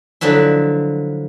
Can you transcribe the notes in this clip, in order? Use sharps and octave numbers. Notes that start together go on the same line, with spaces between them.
D3 F3 F#3 E4